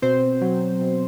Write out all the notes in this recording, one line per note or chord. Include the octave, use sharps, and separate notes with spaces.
B2 C4 C5
F#3
B2